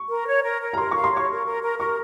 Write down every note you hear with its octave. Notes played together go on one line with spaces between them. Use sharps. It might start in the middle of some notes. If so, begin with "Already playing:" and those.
Already playing: C#6
A#4
C#5
A#4
A#4
A#5
A#4 C6
C#6
F5
C6
C#5 C#6
A#4
A#4
A#4
A#4 C#6